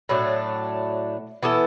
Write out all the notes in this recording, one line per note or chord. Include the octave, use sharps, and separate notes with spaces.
A2 F#3 A3 D4
E3 B3 E4 A4